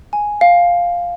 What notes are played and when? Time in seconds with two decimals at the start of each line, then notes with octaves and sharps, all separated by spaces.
0.13 G#5
0.41 F5